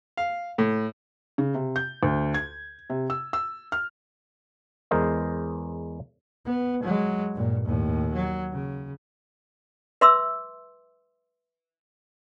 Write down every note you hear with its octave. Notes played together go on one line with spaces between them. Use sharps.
F5
A2
C#3
C3
G6
D2
G#6
C3
E6
E6
F6
E2 G#3 A#4 C5 D#5
B3
F#3 G#3
G2 A#2
D#2 A2
F#3
C#3
B4 E5 C6 D6 E6